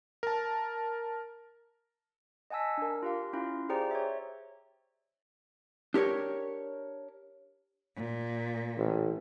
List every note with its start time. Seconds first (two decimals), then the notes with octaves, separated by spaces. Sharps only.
0.23 A#4 A5
2.50 D#5 F#5 G#5 A5 E6 B6
2.78 D4 A#4
3.03 F4 G4 F5
3.33 C#4 E4 F4 F5
3.69 G4 G#4 C5 D5 G5 A#5
3.91 C#5 E5
5.94 D4 G4 A#4 C#5
7.96 A#2
8.77 A1